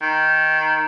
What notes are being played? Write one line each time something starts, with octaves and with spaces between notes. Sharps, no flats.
D#3